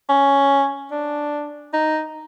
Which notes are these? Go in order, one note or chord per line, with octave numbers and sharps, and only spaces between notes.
C#4
D4
D#4